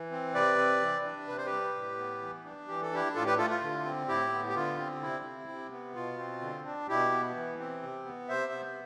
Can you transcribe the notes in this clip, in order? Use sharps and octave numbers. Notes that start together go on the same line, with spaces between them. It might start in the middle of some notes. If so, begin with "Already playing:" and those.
Already playing: E3
C4
C3 B4 D5
C4
E3
D4
C3 B4
C5
G4 B4
G3
A2
B3
E3
D4
E3 G4
A4
D4 E4 G4
A2 F4 A4
G4 B4
A3 F4 A4
F4
D3
C4
A2 E4 G4
B3
G4
D3 F4
C4
C3 E4
C4
C3
B3
B2 F4
C4
D3
D4
B2 E4 G4
B3
E3
C4
C3
B3
C3 C5 E5
B3